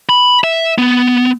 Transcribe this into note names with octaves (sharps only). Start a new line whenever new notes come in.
B5
E5
B3